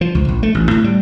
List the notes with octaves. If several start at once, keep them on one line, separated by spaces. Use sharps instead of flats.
F3
C#2
A#1
A3
A1
A2
G3